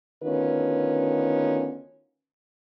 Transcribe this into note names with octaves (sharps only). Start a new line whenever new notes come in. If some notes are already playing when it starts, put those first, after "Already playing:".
D2 D#3 B3 C#4 F4 B4